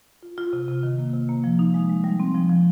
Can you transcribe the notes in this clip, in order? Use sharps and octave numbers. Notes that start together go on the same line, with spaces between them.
F4
F4
C3
C3
D#3
A#3
C3
A#3
F3
D#4
G#3
G#3
G3
C4
F3
F3